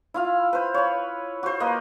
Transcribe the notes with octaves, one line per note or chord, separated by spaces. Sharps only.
E4 F4 F5
B4 C5
C#5 B5
F#4 C5
A#3 B4 D#5